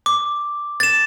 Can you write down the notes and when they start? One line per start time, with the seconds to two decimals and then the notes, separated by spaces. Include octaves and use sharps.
0.06 D6
0.80 A6 E7